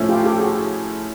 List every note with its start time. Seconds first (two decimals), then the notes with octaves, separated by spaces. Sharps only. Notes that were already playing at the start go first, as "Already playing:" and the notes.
Already playing: A2 F3 A3 C#4 E4
0.09 F4 G4
0.25 G4 A4
0.40 F#4 G#4